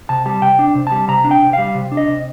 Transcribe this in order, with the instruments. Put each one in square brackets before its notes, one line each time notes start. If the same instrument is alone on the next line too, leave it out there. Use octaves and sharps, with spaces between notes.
[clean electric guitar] C3 A5
G3 A5
C3 G5
D4
C3
A5
G3
C3 A#5
D4
G5
C3
G3 F5
C3
D4
D#5
C3